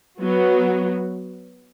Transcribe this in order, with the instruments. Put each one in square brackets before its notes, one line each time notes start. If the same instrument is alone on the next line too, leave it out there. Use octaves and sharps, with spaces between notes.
[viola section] F#3 B3 F#4